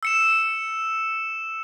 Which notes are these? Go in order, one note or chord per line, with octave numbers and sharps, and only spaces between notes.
E6 C#7 E7